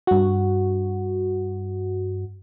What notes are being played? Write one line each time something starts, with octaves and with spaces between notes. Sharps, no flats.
G2 F#4